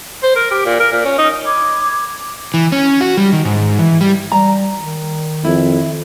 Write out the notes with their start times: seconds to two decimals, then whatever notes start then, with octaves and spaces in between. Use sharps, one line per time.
0.23 C5
0.36 A#4
0.51 G4
0.65 A#2
0.80 A#4
0.92 A#2
1.05 C#4
1.18 D#4
1.45 B5 D6 G#6
2.54 E3
2.72 C#4
3.01 F#4
3.17 G3
3.33 D#3
3.45 G#2
3.79 E3
4.01 G3
4.32 G3 A#5
4.80 D#3
5.44 F2 E4